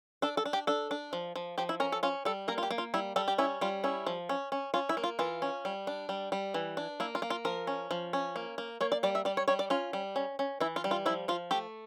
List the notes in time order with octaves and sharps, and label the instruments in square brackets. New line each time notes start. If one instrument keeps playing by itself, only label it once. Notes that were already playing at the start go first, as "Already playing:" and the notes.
[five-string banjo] D4 A4
A4
D4
G4
D4 A4
D4
F3
F3
F3 G4
E4
C#4 A#4
A4
C#4 F4
G3 A4
A#3 A#4
F4
G4
A#3
F4
G3 E4
G3 A4
G4
C#4 E4
G3 F4
C#4 E4
F3
C#4
C#4
C#4 F4
E4
A#3
F4
E3 F4
C#4
G3
D4
G3
G3
E3
D4
A#3 E4
F4
A#3
F4
F3 A#4
C#4
F3
C#4
A#3
A#3
A#3 C#5
D5
G3 D5
E5
G3 D5
C#5
G3 C#5
D5
C#4 F4
G3
C#4
C#4
E3 E4
F4
G3
F4
F3 E4
F3 F4
A3 G4